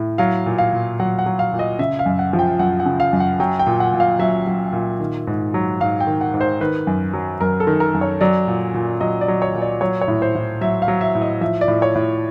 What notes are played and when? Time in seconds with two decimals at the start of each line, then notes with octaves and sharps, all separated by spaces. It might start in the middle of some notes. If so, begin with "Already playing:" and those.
Already playing: A2
0.18 F#3 F5
0.46 A#2
0.58 F5
0.73 A#2
1.00 F#3 F#5
1.19 F#5
1.26 F#3
1.39 F5
1.53 A#2
1.59 D#5
1.79 C#3 E5
1.99 F5
2.06 F#2
2.19 F#5
2.33 F3
2.39 G5
2.59 F#2 F#5
2.80 F#5
2.86 C#3
3.00 F5
3.13 F#2
3.20 F#5
3.40 F#3 G5
3.59 G5
3.66 A#2
3.80 F#5
3.94 A#2
4.00 F5
4.19 F#3 E5
4.47 F#3
4.73 A#2
5.00 D#3
5.27 G#2
5.54 F#3
5.80 G#2 F5
6.00 G5
6.07 D#3
6.21 F#5
6.34 G#2
6.41 C5
6.61 D#3 B4
6.87 F#2
7.13 F#3
7.41 F#2 A#4
7.60 A4
7.67 D#3
7.80 A#4
7.94 F#2
8.01 C#5
8.21 F#3 D5
8.48 A#2
8.74 A#2
9.01 F#3 D#5
9.21 D5
9.28 F#3
9.42 C#5
9.54 A#2
9.62 D5
9.81 F#3 C#5
10.01 C#5
10.08 A2
10.22 C5
10.35 A2
10.61 F#3 E5
10.82 F5
10.88 F#3
11.01 E5
11.15 A2
11.22 D#5
11.41 F3 E5
11.61 D5
11.68 A2
11.82 C#5
11.95 A2